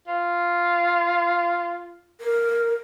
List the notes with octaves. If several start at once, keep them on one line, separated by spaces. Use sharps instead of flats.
F4
A#4